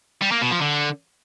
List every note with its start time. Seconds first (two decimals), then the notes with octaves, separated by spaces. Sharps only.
0.22 G3
0.32 A#3
0.41 B2
0.51 F3
0.61 D3